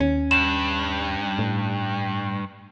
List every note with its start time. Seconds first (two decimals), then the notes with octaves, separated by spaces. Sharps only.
0.01 D#2 C#4
0.31 G2 E7
1.39 A2